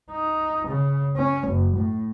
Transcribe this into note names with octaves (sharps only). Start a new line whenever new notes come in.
D#4
C#3
C#4
F#1
A2